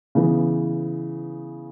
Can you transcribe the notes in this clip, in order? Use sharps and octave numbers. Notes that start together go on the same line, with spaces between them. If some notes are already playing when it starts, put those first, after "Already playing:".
C#3 E3 B3